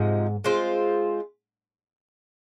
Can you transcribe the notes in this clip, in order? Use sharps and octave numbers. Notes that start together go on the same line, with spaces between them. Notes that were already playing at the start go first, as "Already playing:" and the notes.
Already playing: G#2 C3 F3 G#3 D#4
G#3 C4 F4 C5